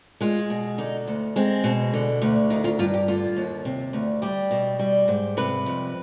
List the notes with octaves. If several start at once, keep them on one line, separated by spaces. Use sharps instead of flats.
G#3 F4
B2
D3 D#4
D2
G#3 C4
B2
D3
D2
D#3 D#4
F4
G2 F4
G4
D3 F4
D#2
C3
D2
G3 G4
B2
G3
G#2
C3 B4
F2